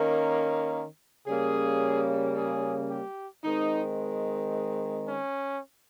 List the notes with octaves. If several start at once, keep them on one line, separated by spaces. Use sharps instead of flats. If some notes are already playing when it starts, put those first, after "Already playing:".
Already playing: D#3 A#3 C#4
C#3 G3 A#3 C#4 G#4
G#4
G4
D#3 G#3 C4 D#4
C#4